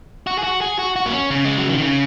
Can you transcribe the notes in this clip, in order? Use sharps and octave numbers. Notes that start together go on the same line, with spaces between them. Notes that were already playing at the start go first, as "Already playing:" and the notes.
F#4
G#4
F#4
G#4
F#4
F#4
A#3
C#4
C#3
G#3
F#3
D#3
C#3